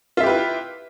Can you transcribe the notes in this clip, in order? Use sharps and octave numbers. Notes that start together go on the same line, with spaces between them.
E4 F4 G4 B4 E5